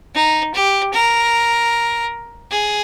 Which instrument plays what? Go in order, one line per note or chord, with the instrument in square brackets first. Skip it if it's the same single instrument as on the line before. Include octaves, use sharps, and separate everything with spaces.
[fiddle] D#4
G4
A#4
G#4